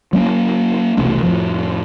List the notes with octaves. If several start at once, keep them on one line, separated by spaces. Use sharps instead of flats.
F#3 A#3 C#4
E1 C2 A3 C#4
F2 A2 F3